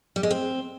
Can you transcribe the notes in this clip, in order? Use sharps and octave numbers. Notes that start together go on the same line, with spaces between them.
G3
G#3
C4